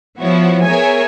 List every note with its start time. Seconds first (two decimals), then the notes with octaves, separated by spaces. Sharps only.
0.19 F3 B3 E4 F#4 C#5
0.63 B3 G#4 A#4 C#5 E5 G#5